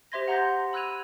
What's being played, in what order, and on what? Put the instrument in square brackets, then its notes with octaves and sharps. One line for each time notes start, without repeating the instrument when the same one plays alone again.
[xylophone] G4 C5 E5 C6 G#6 A#6
F#5 A#5 C6 G6 A#6
B5 E6 F#6 G#6 D#7 F7